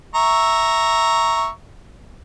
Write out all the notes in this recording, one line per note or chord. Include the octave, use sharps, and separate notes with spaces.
E5 A#5 C#6